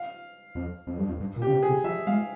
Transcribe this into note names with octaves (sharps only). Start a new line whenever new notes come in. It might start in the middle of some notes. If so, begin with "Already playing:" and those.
Already playing: F5
F2
F2
G2
F2
G2
A#2
C#3 G4
C3
G#4
C3
F3 E5
G#3 F5